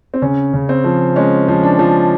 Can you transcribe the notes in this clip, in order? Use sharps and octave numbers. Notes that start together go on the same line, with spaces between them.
C4
C#3 C#4
C#3
C4
F3
G#3 C#4
F3
D4
F3